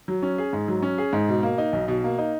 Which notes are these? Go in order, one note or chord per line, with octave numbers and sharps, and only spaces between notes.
F#3
C#4
G#4
G#2
F#3
C#4
G#4
G#2
B2
A#3
D#4
B1
B2
A#3
D#4